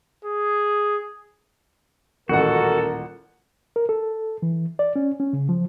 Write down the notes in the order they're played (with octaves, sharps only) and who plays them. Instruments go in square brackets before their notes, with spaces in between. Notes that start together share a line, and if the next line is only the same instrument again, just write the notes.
[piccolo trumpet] G#4
[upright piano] D#1 A1 F#5 [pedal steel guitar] F#4 [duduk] A4 [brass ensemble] A#4
[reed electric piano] A#4
A4
E3
D5
C#4
C#4
C#3
F3